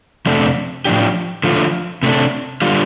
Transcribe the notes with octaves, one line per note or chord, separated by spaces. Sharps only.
F2 C3 A3 D4
A2 F3 D4 G4
D3 F3 A3 F4
C3 A3 D4
D3 G3 F4